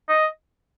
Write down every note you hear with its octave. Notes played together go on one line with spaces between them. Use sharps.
D#5